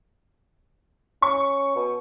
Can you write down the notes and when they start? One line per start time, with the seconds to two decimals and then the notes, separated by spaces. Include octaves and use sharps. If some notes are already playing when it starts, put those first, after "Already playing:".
1.22 C#4 C#6
1.75 B2